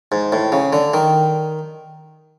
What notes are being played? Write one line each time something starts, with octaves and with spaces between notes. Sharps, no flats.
G#2
A2
C#3
D3
D#3